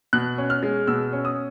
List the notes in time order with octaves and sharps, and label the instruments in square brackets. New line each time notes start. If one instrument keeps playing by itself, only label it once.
[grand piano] B2 F#6
C#4
F6
G#3
B2 E6
C#4
D#6